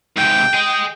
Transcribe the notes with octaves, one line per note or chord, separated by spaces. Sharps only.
G#2 C3 G5
G#4 D#5